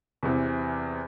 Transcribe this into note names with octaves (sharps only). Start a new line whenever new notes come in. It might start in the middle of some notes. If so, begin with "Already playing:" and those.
E2 C3 E3